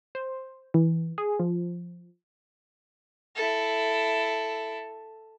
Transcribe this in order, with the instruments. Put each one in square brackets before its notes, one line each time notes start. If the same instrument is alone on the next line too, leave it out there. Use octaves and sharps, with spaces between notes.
[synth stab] C5
E3
G#4
F3
[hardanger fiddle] E4 A4